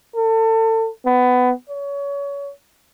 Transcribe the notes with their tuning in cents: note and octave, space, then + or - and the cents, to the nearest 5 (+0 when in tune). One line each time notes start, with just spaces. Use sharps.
A4 +30
B3 +20
C#5 +30